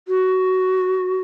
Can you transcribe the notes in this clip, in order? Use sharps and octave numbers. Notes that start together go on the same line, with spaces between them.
F#4